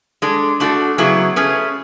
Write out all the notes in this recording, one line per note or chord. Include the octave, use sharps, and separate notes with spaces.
G#3 D4 A4
A3 D4 F#4 A4
C#3 F#3 B3 E4 G#4
A3 C#4 G#4 B4